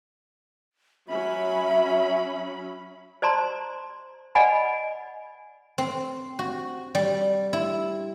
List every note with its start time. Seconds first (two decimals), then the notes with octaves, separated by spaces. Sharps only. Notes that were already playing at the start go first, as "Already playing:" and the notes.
1.09 F#3 C#4 E5 B5
3.22 C5 D5 A5 A#5 C6
4.35 D5 D#5 F#5 G#5 B5
5.78 C4
6.39 F#4
6.95 G3
7.53 E4